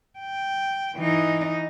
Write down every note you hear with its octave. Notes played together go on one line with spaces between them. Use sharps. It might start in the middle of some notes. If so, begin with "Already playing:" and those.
G5
E3 D#4